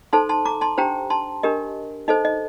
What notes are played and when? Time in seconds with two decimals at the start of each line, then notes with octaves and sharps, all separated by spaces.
0.13 D#4 A4 C5 A5 C6
0.29 A5 C6
0.45 A#5 D6
0.61 A5 C6
0.78 D4 G4 C5 G5 A#5
1.10 A5 C6
1.43 D4 G4 A#4 D#5
2.08 D#4 A4 C5 D#5
2.25 D#5